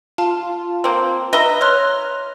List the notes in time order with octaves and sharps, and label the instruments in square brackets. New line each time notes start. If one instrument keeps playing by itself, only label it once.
[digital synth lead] F4 [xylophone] A5
[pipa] A#3 C4
[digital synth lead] B4 [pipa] D#5 E5 A#5 [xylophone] A#6 G7
[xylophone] C#5 C6 F#6 [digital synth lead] F6